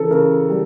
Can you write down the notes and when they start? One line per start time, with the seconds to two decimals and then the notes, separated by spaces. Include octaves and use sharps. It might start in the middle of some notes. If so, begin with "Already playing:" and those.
Already playing: C#3 E3 A4 A#4
0.11 C#3 A#4
0.50 G3